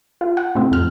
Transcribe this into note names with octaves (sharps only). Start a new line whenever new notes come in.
F4
F#5
A2 C3 C4
F2 F6